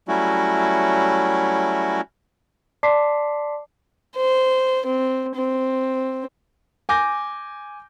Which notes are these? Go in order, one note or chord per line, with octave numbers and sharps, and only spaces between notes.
F#3 G3 A3 C#4 E4 F#4
D5 A5 C6 D6 B6 C7
C5
C4
C4
G#5 D6 G6 A#6